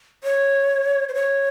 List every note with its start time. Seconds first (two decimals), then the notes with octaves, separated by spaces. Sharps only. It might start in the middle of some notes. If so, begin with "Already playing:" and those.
0.24 C#5
1.09 C5
1.14 C#5